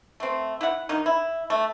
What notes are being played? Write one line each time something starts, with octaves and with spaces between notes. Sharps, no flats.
A3 C4
E4 F#5
D#3 D#4
E4
A3